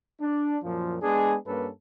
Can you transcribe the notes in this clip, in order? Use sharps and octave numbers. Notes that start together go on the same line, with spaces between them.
D4
F#2 A#2 F3
G#3 B3 D4 G#4
G2 A#3 C#4 A4 B4